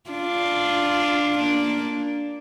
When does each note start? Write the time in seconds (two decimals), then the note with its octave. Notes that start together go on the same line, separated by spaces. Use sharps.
0.10 D4 F4
1.38 A#3 D4